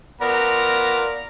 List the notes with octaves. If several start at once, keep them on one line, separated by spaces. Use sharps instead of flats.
B3 F4 A#4 D5 A#5